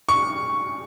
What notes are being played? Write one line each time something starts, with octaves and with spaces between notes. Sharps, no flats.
C#6